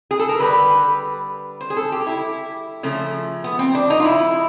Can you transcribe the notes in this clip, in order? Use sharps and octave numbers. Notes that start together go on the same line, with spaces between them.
G#4
A4
A#4
D3 G3 B4
C5
G#4
A4
G4
E4
C#3 F3 A3
B3
C4
D4
D#4
F4
E4